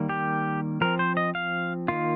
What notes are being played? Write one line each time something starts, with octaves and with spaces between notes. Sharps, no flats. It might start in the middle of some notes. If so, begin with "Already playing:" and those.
Already playing: D#3 G3 A#3
G4
F3 C4 A#4
C5
D#5
F5
D#3 A#3 F4